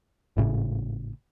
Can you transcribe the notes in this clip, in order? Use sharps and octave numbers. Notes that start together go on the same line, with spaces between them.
G#1 A2 C#3